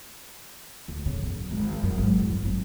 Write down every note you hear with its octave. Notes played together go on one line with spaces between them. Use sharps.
D2
C#3
F#1
G#1
F#2
G#1
C2
F#3
C4